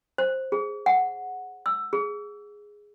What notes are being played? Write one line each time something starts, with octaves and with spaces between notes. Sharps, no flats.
C5
G#4
F#5
E6
G#4